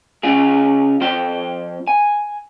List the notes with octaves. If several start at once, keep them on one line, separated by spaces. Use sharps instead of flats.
C#3 F4 G#4
F2 C4 F4 G5
G#5